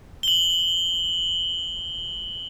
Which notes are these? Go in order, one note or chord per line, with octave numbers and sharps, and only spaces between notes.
F#7 G7